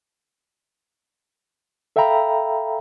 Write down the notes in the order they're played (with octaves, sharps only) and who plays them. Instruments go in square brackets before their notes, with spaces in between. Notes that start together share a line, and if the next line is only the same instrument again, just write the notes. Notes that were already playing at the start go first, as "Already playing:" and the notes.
[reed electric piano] A4 E5 F5 G5 A#5 B5